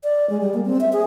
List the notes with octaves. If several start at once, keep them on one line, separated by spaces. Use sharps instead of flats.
D5
G#3
G3
A#3
C4
E5
G#4